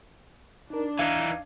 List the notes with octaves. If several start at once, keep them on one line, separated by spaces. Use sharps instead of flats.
D4 D#4 A#4
D#2 E3 D#4 F5 G#6